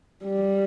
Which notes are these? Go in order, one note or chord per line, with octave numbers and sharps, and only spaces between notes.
G3